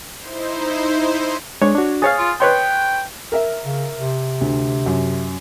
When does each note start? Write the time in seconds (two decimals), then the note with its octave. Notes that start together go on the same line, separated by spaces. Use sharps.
0.18 D#4 E4 C5
1.62 G#3 D4 G#4 C#5
1.75 D4 F#4
2.02 G#4 C#5 F5 D#6 A6
2.19 F4
2.40 B4 C#5 G5 C6
3.32 A#4 E5
3.64 C#3
3.96 C3
4.41 D2
4.86 F#2